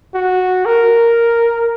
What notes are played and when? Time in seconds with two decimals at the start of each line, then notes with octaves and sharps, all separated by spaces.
0.14 F#4
0.66 A#4